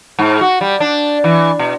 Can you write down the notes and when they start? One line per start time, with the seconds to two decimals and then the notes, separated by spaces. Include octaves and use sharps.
0.19 G#2
0.41 F#4
0.61 G3
0.80 D4
1.24 E3
1.59 B2